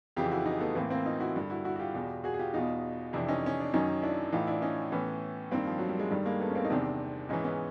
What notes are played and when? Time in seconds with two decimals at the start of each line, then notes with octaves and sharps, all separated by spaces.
0.16 F2 C#3 E3 F4 G4
0.31 E4 F#4
0.45 D#4 F4
0.60 A3 B3
0.75 A2 E3 A#3 C4
0.90 A#3 C4
1.06 D#4 F4
1.20 E4 F#4
1.36 G2 D3
1.50 E4 F#4
1.64 E4 F#4
1.76 F#4
1.79 F4 G4
1.94 E2 B2
2.24 F#4 G#4
2.34 G#4
2.39 F4 G4
2.54 E2 B2 D#4 F4
3.13 F2 C3 E3 D4 E4
3.28 C#4 D#4
3.46 C#4
3.60 D4
3.74 F#2 D#3 C#4 D#4
4.02 D4 E4
4.32 A2 E3 D#4 F4
4.47 D4 E4
4.62 C#4 D#4
4.92 A2 E3 B3 C#4
5.51 G2 D#3 A#3 C4
5.67 F3
5.79 F#3
5.89 G3
5.99 G#3
6.10 G2 D#3 G3 A3
6.26 G#3 A#3
6.40 A3 B3
6.50 C#4
6.55 A#3 C4
6.65 D#4
6.70 E2 C3 D#3 C4 D4
7.29 G#2 E3 C#4 D#4
7.44 B3 C#4